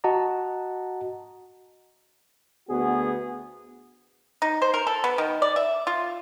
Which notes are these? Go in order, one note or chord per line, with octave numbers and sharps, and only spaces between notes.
F#4 D#5 F#5 A5 A#5
D2 B3 F#4 G#4
D#4
C5
A#4
A4
B3
D#3
D5
E5
F4